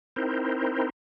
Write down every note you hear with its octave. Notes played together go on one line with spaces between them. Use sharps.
C4 D#4 E4 A#4 C5